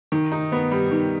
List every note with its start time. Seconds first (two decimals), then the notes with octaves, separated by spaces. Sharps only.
0.12 D#3
0.32 D#4
0.52 B3
0.71 G3
0.92 D#3